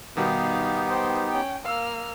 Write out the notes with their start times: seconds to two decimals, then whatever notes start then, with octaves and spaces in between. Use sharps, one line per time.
0.17 B2 D#3 G3 B3 D#4 G4 F5
0.89 C5 G5
1.29 C#4 G5
1.65 A#3 F5 E6 F6